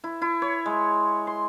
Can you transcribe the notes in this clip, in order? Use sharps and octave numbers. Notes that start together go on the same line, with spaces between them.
E4
E4
C#5
G#3
C6